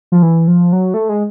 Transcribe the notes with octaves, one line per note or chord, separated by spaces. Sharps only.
F3
E3
F3
F#3
A3
G#3